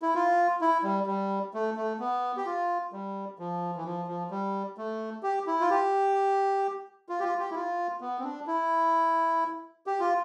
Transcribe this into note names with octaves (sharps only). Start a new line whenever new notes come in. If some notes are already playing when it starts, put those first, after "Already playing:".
E4
F4
E4
G3
G3
A3
A3
B3
G4
F4
G3
F3
E3
F3
F3
G3
A3
G4
E4
F4
G4
F4
G4
F4
G4
E4
F4
B3
C4
D4
E4
G4
F4